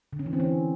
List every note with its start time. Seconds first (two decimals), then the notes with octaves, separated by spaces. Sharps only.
0.13 D3
0.19 C#4
0.26 E3
0.33 C4
0.40 C#4